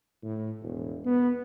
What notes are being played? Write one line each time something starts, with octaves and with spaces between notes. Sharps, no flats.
A2
E1
B3